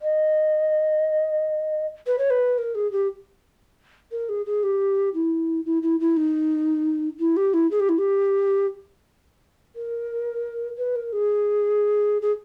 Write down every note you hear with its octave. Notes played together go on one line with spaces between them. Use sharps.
D#5
B4
C#5
B4
A#4
G#4
G4
A#4
G#4
G#4
G4
E4
E4
E4
E4
D#4
E4
G4
E4
G#4
G4
E4
G4
A#4
B4
A#4
G#4
G#4